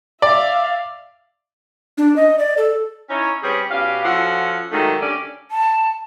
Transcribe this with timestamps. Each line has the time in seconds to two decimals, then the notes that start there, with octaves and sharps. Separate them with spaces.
0.22 D5 E5 F5
1.98 D4
2.16 D#5
2.39 D5
2.58 A4
3.09 C#4 D#4 E4 C#5
3.42 G3 C4 C#4 G4 G#4 B4
3.71 B2 C#4 G4 D5 F5
4.04 F3 C#4 F#4 A4 F#5
4.70 G#2 D#3 F#3 A3
5.01 D3 C#4 G4 D5
5.51 A5